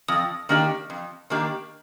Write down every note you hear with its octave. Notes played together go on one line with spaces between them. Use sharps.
F2 D#6
D#3 A#3 D4 G4
F2
D#3 A#3 D4 G4